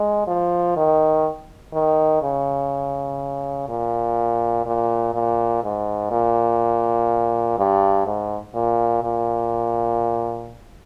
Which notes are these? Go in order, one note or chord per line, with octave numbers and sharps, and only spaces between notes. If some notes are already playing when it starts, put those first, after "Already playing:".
Already playing: G#3
F3
D#3
D#3
C#3
A#2
A#2
A#2
G#2
A#2
G2
G#2
A#2
A#2